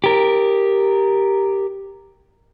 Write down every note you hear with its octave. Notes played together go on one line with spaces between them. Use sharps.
G4 A#4